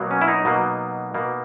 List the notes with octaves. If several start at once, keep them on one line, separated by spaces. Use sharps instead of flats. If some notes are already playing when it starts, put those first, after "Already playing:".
Already playing: B2 F#3 A#3
C#4
E4
D#4
B2 F#3 A#3
B2 A#3